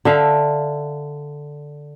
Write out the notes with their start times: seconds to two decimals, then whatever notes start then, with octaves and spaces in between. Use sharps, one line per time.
0.05 D3 E5 F5